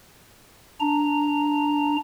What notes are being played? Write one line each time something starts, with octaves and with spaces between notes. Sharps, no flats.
D4 A#5